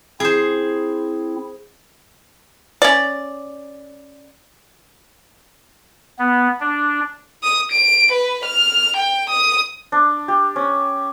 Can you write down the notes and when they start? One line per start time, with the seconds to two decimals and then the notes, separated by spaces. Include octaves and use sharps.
0.20 C4 E4 G#4 C5
2.82 C#4 D5
6.19 B3
6.60 D4
7.43 D#6
7.72 D7
8.12 B4
8.45 F6
8.97 G5
9.30 D#6
9.92 D4
10.28 G4
10.56 C#4